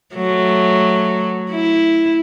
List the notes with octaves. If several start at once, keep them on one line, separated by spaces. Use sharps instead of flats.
F#3 A3
E4